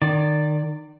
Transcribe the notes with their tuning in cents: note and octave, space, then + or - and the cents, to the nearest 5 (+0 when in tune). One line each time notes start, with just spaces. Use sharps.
D#3 -30 D5 +0